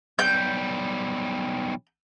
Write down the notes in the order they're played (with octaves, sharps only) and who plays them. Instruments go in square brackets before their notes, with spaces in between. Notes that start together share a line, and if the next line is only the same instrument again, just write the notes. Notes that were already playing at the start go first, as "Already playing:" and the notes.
[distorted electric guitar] B1 G3 [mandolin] G6